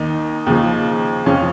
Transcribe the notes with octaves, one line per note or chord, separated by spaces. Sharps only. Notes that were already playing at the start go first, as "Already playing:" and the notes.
Already playing: D#2 D#3 D#4
D#2 C#3 F3
F2 C#3 F3 C#4